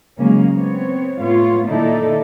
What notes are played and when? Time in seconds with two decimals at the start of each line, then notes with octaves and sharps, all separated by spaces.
0.17 C#3 F#3 G#3 A#3 C#4
0.54 B3 C4 C#5
1.19 A2 B3 F4 C#5 F5
1.68 A#2 D#3 D#4 E4 A4 D5